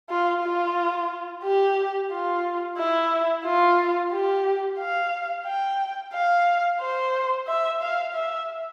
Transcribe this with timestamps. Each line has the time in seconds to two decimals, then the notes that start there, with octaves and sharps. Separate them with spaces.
0.10 F4
0.43 F4
1.44 G4
2.11 F4
2.78 E4
3.45 F4
4.12 G4
4.79 F5
5.46 G5
6.13 F5
6.81 C5
7.48 E5
7.81 F5
8.15 E5